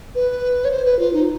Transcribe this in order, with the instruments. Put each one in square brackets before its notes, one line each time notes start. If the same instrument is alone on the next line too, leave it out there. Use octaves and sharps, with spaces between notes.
[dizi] B4
C#5
C5
B4
F4
D#4